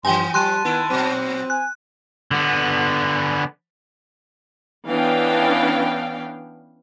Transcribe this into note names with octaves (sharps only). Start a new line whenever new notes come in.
G2 E3 B3 G5 G#5 C6
F3 G3 A5 C6 F#6 D#7
D#3 B3 E4
A#2 F#3 C4
G#5 F#6
D3 B3
E3 B3 C#4 D4 F5 G5